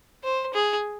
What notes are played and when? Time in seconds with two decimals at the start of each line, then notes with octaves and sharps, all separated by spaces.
0.23 C5
0.54 G#4